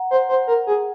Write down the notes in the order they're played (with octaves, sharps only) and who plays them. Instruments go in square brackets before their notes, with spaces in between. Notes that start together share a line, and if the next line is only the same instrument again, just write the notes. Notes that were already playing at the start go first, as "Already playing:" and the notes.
Already playing: [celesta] F#5 A#5
[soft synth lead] C5
C5
A#4
G#4